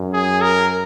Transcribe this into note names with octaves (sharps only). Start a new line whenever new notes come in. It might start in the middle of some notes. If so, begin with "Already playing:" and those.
Already playing: F#2
G#4
A#4